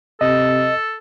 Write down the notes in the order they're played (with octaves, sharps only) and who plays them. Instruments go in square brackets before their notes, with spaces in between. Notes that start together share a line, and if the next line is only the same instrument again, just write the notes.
[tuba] C3 [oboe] A4 [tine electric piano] D#5